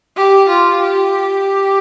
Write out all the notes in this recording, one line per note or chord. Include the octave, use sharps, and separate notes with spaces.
G4
F4
G4